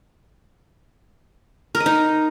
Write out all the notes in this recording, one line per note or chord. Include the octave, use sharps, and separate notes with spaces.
A#4
D#5
D#4